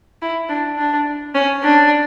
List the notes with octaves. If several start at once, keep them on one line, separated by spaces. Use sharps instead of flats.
E4
D4
D4
C#4
D4